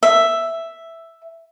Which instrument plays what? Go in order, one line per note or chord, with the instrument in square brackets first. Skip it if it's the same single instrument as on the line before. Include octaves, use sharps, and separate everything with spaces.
[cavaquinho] E5